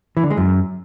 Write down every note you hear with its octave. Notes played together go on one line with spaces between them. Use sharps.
E3
D3
G#3
F#2